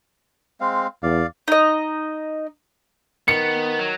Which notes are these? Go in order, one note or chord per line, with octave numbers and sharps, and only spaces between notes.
G#3 C4 F5
E2 D5 F5
D#4 D#5
D#3 B3 C#7
F#3